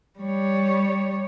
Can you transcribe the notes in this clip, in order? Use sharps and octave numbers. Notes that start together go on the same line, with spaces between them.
G3 C#5